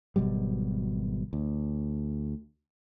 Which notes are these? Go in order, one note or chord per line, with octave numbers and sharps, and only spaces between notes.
G#1 B2 F#3 G3
D2